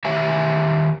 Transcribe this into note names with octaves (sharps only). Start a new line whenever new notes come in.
D#3 G4 C#5 E5 G#5